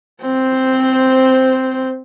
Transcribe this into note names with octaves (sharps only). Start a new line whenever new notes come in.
C4 C5